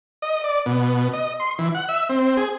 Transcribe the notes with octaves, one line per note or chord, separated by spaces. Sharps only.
D#5
D5
B2
D#5
C6
E3
F#5
E5
C4
G#4